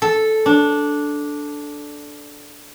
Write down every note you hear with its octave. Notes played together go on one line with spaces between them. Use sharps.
A4
D4